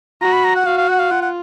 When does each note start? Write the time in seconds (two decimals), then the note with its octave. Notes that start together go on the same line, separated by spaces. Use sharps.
0.22 F#4 A#5
0.33 B5
0.45 A#5
0.56 F#5
0.66 F#4 F5
0.78 F5
0.89 F#5
0.99 F5
1.11 F4 F#5
1.22 F#5